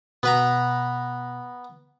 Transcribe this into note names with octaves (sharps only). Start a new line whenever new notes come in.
B2 B3 B4 A#5